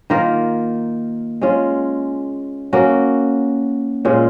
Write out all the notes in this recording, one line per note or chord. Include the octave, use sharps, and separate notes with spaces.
D#3 A#3 F4 A#4
G#3 C#4 F4
A#3 C#4 F#4
A#2 G#3 C#4 F4